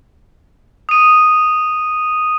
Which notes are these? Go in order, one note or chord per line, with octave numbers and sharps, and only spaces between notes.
D#6 D#7